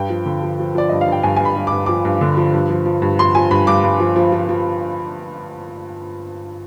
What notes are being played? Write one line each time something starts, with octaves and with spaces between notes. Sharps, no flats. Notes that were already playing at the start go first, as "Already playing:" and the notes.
Already playing: G2 G5
F3
D3
F3
F3
F3 D5
G2 D#5
F5
G2 G5
G2 G#5
G2 G#5
B5
G2
D6
G2
F3 D6
G2
D3
F3
G2
F3
F3
G2
F3 C6
F3 G#5
G2 B5
G2 D6
G2
F3
F3
F3
F3